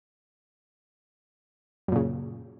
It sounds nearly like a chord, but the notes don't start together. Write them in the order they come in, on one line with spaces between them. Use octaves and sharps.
F#2 A#2 C#3